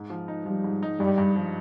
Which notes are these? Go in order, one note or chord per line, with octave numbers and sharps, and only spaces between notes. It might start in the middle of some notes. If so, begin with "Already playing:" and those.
Already playing: G#2
F3
D#4
F3 G3
G#2
D#4
G2 G3
G2
F3